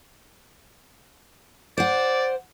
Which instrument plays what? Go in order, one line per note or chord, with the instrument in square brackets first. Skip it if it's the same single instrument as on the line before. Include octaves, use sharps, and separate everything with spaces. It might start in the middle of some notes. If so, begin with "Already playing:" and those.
[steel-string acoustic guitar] C5 F#5 [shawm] D5